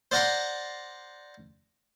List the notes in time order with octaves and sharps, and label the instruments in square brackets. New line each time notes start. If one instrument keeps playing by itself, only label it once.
[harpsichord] C5 D5 F5 F#5 A#5 C6